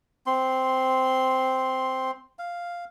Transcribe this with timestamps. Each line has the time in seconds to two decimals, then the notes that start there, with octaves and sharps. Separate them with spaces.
0.26 C4 C6
2.39 F5